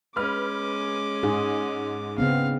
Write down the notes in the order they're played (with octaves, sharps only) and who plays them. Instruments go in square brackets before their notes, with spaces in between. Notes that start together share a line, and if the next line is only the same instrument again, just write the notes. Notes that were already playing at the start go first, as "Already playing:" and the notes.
[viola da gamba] G#3 C#4 [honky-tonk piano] B4 F6 [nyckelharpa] D6
[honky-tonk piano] G#2 [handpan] G#4
[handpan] C#3 B3 C4 [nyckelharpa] F5